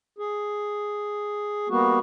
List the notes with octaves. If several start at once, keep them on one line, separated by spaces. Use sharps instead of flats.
G#4
G3 A#3 B3 F#4